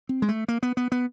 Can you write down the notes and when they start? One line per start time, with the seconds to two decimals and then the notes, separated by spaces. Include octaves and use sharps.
0.09 C4
0.22 G#3
0.29 A3
0.48 A#3
0.63 B3
0.77 B3
0.92 B3